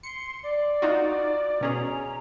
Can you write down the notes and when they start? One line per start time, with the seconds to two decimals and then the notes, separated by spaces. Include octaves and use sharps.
0.03 C6 C#7
0.43 D5
0.82 D#4 F4 F#4
1.61 B2 C#4 G#4 A#5